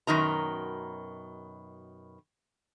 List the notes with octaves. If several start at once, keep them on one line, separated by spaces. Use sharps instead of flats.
F#2 B2 D#3 A#5